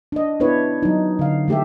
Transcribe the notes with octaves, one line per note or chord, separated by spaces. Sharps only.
D4 D#5
B3 D4 E4 B4 C#5
F#3 D#4
D3 F5
E3 A3 G4 A4 E5